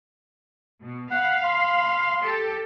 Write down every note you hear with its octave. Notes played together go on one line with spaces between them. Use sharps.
B2
F5 F#5 B5
C6
G4 A4